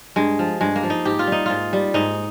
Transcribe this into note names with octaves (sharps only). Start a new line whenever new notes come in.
G2 G#3
F3
G2 G#3
A#3
F3
D#4
G#2 G4
F4
G3 D#4
G#2 F4
G3
G#2 D#4